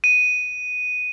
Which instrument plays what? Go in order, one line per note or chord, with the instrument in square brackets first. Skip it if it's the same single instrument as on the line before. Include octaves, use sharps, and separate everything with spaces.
[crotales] D#7